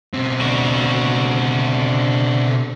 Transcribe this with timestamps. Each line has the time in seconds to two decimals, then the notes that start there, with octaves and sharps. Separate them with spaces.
0.14 B2 C4
0.41 D3 F#4